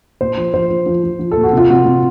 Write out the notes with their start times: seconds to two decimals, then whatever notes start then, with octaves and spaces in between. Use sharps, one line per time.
0.21 A#2 C5
0.37 F3
0.54 F3 C5
0.70 F3
0.86 F3
1.04 F3
1.19 F3
1.31 A4
1.37 A#2
1.43 F#4
1.53 C3 F4
1.70 C3 F#4
1.86 C3